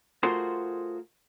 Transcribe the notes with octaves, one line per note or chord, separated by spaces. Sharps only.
A3 F4 F#4 G#4 A#4 C5